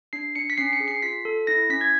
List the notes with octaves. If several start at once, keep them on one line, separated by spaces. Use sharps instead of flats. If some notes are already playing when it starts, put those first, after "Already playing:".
D4 C7
D4 C#7
B6
C#4 C7
C#7
G#4
C7
F4 B6
A4
E4 A#6
C#4 B6
G#6